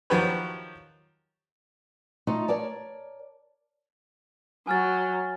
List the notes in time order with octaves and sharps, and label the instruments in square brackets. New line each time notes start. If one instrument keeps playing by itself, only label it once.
[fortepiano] D#3 F3 F#3 G4 B4 C#5
[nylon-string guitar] A3 D#4 F4
A#4 C#5 D5 A5
[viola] F#3 [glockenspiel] G#5 F6 A6